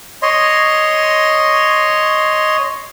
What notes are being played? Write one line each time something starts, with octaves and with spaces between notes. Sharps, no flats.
C#5 D#5 C6